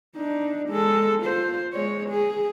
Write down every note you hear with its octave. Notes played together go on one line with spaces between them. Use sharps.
D4 D#4
G#3 A4
F4 C5
G#3 C#5
G#4